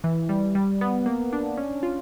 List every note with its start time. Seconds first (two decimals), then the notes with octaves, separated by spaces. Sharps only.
0.04 E3
0.29 G3
0.55 G3
0.81 B3
1.06 A#3
1.33 D4
1.57 C#4
1.83 F4